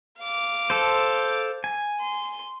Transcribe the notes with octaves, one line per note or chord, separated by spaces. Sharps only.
F5 D6
A4 C5
G#5
C6